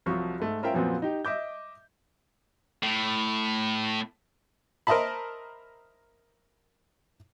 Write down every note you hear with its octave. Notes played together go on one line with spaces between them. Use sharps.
C2 F3 F#3 C#6
G#2 A3
C#4 F4 A#4 C5 E5 G5
F2 A#2 F3 F#3 B3 C4
D#4 G4
D#5 E5 D6 G6
A2
A#4 C5 D#5 E5 A5 B5